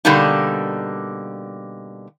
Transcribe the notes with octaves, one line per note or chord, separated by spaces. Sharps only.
B2 D3 G3 A#3 D4 D#4